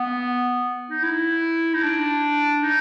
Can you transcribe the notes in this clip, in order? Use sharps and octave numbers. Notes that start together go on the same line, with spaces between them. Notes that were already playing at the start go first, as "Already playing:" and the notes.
Already playing: B3
D#4
E4
D#4
D4
D#4